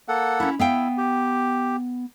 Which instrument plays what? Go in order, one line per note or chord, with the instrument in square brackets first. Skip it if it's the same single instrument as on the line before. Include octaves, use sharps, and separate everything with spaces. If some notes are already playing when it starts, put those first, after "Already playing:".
[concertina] A#3 A4 F#5
[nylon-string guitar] C#4 E4
[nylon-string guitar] B3 F5 G5 [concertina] E4
[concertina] G4